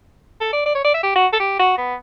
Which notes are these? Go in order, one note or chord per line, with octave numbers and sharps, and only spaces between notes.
A4
D5
D5
C#5
D5
E5
G4
F#4
A4
G4
F#4
B3